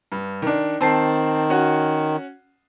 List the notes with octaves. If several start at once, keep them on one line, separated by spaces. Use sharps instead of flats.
G2
D#3 D4
D#3 C4 A5 C7
C#4 F#4 F#5